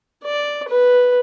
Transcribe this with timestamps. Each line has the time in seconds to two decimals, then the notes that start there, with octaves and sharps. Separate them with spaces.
0.24 D5
0.69 B4